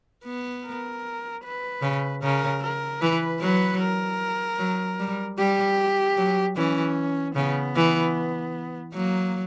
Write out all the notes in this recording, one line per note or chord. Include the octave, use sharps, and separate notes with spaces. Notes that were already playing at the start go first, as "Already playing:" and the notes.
B3
A#4
B4
C#3
C#3 A#4
A#4
E3 B4
F#3 B4
A#4
F#3
G3
G3 G4
F#3
E3 C#4
C#3 B3
E3
F#3 A#3